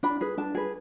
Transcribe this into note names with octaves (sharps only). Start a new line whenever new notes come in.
D4 B5
G#4 B4
D4 A5
G#4 B4